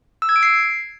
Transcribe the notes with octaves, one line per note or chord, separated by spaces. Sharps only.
E6
G#6
D7
C7